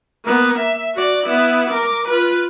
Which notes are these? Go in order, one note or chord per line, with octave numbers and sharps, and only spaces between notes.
A#3 B3
E5
F#4 D5
B3 E4
A#4 D6
F4 B4